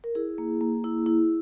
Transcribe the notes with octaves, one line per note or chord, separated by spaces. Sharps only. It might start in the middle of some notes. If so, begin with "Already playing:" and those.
A#4
E4 G#4
A#3
A#3
E4
E4